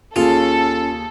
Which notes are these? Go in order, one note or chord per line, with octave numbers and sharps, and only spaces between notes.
D#2 C#4 F4 G#4 A4